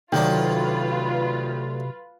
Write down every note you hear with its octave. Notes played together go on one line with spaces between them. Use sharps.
D2 C3 D#3 F#3 D4 F4 B4